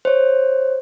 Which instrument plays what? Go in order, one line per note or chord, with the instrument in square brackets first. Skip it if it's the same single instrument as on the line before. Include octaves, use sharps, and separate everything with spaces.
[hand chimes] C5 C#5